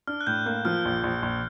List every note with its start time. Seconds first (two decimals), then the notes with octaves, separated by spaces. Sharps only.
0.07 D4 F6
0.21 F#6
0.27 A2 G6
0.46 A#3 G6
0.65 F3 F6
0.85 A#1
1.03 A#1
1.22 A#1